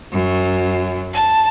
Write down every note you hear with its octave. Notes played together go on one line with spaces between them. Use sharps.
F#2
A5